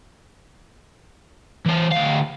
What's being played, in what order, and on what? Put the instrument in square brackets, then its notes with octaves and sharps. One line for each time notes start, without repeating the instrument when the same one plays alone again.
[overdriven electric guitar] E3 C5
D2 F5